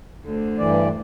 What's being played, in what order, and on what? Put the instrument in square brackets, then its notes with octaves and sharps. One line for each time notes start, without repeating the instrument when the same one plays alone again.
[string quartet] D2 D3 C5
[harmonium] G2 E3 D5